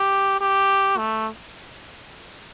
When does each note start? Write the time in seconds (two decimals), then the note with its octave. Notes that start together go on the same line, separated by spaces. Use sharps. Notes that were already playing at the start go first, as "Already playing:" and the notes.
Already playing: G4
0.41 G4
0.98 A3